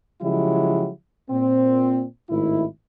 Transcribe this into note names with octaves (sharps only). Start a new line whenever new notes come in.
C#3 F3 F#3 G#3 E4 G4
A#2 C4
G#1 A2 D#3 E4